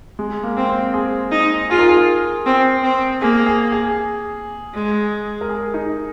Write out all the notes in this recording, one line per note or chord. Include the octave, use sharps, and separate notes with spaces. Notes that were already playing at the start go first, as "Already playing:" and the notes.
G#3
A#3
C4
C4
G#4
D#4
F4 G#4
A#4
G#4
C4
C4
A#3 G#4
G#4
G#4
G#3
A#4
G#4
D#4